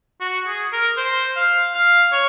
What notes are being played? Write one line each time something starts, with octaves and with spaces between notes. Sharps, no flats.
F#4
G#4
A#4
C5
F5
F5
C#5